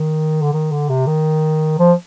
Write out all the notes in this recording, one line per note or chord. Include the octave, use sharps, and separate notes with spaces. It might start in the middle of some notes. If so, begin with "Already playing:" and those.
Already playing: D#3
D3
D#3
D3
C3
D#3
F3